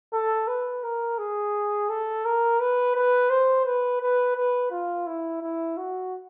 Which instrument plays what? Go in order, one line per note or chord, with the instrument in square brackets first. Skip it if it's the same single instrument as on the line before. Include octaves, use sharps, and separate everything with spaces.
[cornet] A4
B4
A#4
G#4
A4
A#4
B4
B4
C5
B4
B4
B4
F4
E4
E4
F#4